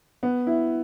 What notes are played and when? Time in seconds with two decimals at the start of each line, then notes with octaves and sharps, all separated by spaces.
0.23 B3
0.47 E4